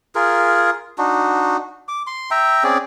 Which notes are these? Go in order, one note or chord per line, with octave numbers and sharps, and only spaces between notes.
F4 G#4 A#4
D4 D#4 F#4
D6
C6
E5 G5 A#5
C4 C#4 G#4 D5